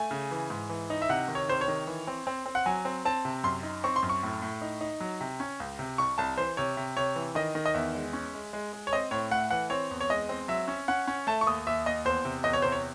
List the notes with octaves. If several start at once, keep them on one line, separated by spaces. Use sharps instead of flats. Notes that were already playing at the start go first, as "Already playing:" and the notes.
Already playing: A3 G#5
C#3
E3
G#2
E3
D#4
E5
C3 F#5
D#3
C#5
C3 C5
C#5
D#3
E3
C4
C4
C4
F#5
F#3 G#5
C4
C4 A5
C3
F#2 C6
D#4
C4 C#6
C6
F#2
C#6
A2
A2
D#4
D#4
F#3
C3
C#4
C#2
C3
C2 C#6
C2 A5
E3 C5
C3 C#5
C3
C3 C#5
E3
D#3 D#5
D#3
D#5
E2 E5
G#3
C#4
G#3
G#3
G#3
C#5
C4 D#5
A2 C#5
A3 F#5
E3 F#5
C4 C#5
E2
C#5
G#3 D#5
C4
F#3 E5
C#4
C#4 F#5
C#4
A3 A5
C#6
D#2 D#6
D#2 E5
D#2 D#5
E2 C5
C3
E2 D#5
C#5
C3 C5
C#5